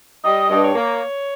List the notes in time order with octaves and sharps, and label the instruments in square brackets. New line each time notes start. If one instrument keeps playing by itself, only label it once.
[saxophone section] G3 D#5
G2
C#5
A#3